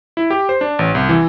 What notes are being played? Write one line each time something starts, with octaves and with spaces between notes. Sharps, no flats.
E4
G4
C5
D4
A1
C2
E3